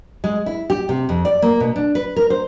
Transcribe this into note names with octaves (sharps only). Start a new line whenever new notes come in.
G#3
E4
G4
C3
F2
D5
A#3
B2
D4
B4
A#4
C5